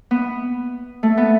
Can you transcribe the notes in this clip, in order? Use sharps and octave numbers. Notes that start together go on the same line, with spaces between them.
B3
A3
B3